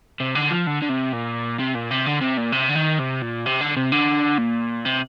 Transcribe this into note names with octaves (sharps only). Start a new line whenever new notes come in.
C3
D3
F3
D3
D3
C3
A#2
C3
A#2
C3
D3
C3
A#2
C3
D3
D#3
C3
A#2
C3
D3
C3
D3
A#2
C3